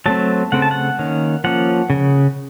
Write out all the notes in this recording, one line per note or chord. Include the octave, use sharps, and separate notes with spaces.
F#3 A3 C4 A5
C#3 A3 C4 F#5
A5
F#5
D#3 A#3 C#4
F3 A#3 C#4 F#5
C#3